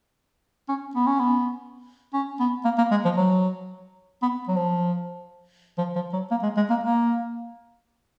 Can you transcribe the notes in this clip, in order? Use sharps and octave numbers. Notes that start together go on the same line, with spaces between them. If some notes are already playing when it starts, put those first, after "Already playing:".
C#4
B3
C#4
B3
C#4
B3
A#3
A#3
G#3
F3
F#3
B3
F#3
F3
F3
F3
F#3
A#3
G#3
G#3
A#3
A#3